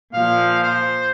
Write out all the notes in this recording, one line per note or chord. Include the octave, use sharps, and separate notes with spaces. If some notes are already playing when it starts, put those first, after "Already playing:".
A#2 F3 F5
C5